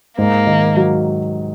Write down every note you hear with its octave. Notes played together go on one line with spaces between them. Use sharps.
G#2 A#3
D#3
F#3